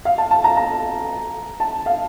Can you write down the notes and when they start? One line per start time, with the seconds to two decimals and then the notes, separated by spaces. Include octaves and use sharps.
0.05 F5
0.18 A5
0.31 A5
0.44 A#5
0.57 A#5
1.60 A5
1.86 F5